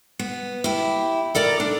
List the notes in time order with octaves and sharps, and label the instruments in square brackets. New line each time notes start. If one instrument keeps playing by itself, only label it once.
[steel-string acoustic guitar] B3
E4 G4
A4 A#4 D5 A#5
D4